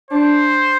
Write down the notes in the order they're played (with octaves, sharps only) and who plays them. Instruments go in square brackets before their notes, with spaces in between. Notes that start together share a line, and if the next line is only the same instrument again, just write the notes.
[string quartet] D4 [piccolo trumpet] C5